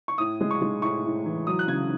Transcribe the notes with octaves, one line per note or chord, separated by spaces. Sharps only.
C#6
A2 D#6
G#3
C#6
G#3
A2 C#6
A2
E3
F#3 D#6
F#6
C#3 G#6